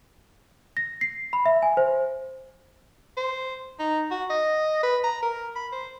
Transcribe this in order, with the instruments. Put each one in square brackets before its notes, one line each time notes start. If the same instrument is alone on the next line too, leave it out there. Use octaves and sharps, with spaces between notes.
[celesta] A#6
C7
B5
E5
G#5
C5
[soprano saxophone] C5
D#4
F#4
D#5
B4
A#5
A#4
B5
C5